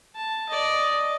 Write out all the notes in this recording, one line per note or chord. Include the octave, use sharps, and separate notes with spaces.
A5
D5 D#5